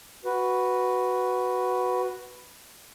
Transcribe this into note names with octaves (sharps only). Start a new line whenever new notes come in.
F#4 B4